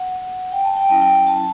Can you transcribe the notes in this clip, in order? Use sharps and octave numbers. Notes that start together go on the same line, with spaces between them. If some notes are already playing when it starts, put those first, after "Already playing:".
Already playing: F#5
G5
A5
G5
F#3 C#4 E4 A5
G5
A5